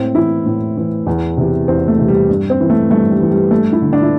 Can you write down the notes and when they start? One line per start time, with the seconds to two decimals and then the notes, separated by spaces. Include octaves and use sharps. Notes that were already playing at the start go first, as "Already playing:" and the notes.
Already playing: A2 C4
0.15 E3 E4
0.46 A2
0.77 E3
1.06 E2
1.37 C3 E3
1.68 E2 C4
1.88 A3
1.98 C3 E3
2.08 G3
2.29 G2
2.50 C4
2.60 E3
2.70 A3
2.90 G2 A3
3.11 G3
3.20 E3
3.31 G3
3.51 G2 A3
3.72 E4
3.82 D3
3.93 D4
4.03 E4